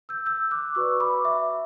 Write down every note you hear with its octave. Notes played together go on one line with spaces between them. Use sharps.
E6 G6
E6 G6
D6 F#6
F#4 B4 D5 C#6 E6
B5 D6
E5